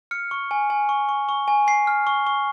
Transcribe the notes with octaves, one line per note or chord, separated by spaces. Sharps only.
F6 C#7
C#6
G#5
G#5
C#6
C#6
C#6
G#5
G#5 C7
F6
C#6
C#6